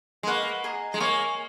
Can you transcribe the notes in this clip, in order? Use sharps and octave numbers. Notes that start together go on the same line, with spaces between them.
G#3
A#3 B4 F#5 C#6
G#4 D#5 A#5
G#3
A#3 C#5 G#5 D#6